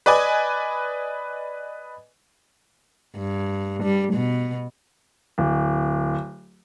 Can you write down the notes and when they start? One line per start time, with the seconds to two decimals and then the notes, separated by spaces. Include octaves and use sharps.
0.06 B4 D5 D#5 G#5
3.16 G2
3.83 G3
4.13 B2
5.38 D1